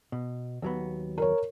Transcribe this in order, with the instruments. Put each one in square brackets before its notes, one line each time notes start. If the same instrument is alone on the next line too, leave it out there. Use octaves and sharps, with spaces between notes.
[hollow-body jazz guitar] B2
D#2 F#3 B3
[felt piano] A#4 C#5